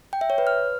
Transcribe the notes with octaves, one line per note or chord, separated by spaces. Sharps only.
G5
E5
C#5
B4
F6